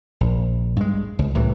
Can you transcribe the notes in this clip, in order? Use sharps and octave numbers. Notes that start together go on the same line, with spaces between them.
A#1
G2 G#3
C#2
C2 A2 C3 E3